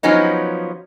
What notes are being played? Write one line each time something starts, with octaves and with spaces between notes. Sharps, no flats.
F3 F#3 B3 C#4 D#4